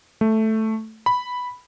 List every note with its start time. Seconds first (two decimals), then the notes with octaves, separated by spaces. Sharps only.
0.21 A3
1.06 B5